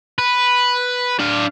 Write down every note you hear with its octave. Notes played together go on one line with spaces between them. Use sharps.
B4
D4 F5